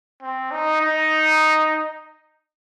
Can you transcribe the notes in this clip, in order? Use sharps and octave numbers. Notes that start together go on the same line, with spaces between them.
C4
D#4
D#4